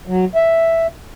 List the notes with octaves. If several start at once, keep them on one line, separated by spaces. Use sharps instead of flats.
F#3
E5